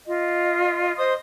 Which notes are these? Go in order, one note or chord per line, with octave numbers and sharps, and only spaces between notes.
F4 D#5
C5 D#5 C6 D#6